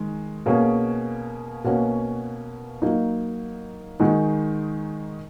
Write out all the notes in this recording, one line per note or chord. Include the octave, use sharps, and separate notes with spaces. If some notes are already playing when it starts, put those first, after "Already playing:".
Already playing: D#3 G#3
B2 A#3 C#4 G#4
B2 A#3 C#4 F#4
F#3 A#3 D#4
D#3 G#3 D#4 F#4